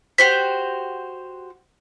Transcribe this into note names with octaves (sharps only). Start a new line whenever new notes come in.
F#4 G4 C5 B6